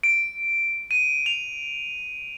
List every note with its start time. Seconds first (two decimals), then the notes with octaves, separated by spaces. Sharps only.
0.03 D7
0.91 D#7
1.26 F7